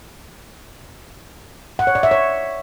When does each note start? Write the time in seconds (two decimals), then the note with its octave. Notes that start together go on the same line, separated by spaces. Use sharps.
1.79 F#5
1.87 C#5
1.95 D5
2.03 E5
2.11 C#5